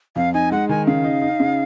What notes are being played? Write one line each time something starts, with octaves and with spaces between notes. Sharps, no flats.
F2 F5
D#4 G#5
G#3 F#5
D#3 G#5
C#3 F5
D#4
D#4
C#3